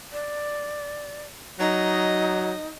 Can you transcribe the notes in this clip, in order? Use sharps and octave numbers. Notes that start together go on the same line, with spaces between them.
D5
F#3 D#4 D#5